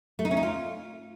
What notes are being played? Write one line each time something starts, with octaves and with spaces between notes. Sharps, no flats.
A3
D#4
C#4
D#4
F4